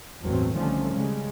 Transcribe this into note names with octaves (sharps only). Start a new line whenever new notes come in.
G1 E2 A2 F#3 A3 C4
C2 D3 D#3 F3 A3 C#4
C#3 G3 G#3